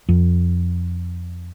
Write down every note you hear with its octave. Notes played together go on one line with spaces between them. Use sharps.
F2